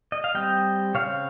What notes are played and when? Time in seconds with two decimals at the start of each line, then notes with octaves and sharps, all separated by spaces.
0.12 D#5
0.24 F5
0.34 G3 C4 D#5 G5
0.95 C#3 G#3 C4 C#5 F5